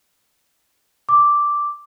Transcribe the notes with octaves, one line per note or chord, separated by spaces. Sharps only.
D6